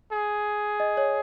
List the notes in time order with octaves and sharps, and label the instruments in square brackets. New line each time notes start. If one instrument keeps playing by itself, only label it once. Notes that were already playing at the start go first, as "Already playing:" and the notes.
[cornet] G#4
[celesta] D#5
C#5